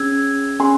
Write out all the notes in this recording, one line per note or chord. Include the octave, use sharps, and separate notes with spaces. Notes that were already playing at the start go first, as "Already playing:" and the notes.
Already playing: C#4 G#4 E6 G#6
C#4 G#4 G#5 C6